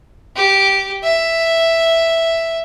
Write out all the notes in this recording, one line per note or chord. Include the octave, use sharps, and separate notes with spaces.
G4
E5